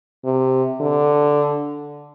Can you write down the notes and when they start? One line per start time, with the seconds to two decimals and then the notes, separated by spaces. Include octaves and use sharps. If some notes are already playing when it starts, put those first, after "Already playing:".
0.25 C3
0.81 D3